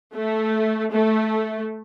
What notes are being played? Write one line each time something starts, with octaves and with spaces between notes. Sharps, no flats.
A3
A3